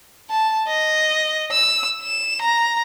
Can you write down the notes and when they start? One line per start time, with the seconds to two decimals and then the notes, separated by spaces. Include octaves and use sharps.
0.30 A5
0.68 D#5
1.51 E6
2.02 E7
2.42 A#5